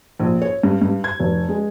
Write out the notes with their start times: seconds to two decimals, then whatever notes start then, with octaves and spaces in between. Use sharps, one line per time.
0.19 A#1
0.42 C#5
0.63 G2
0.82 G2
1.04 G#6
1.20 F1
1.49 G#3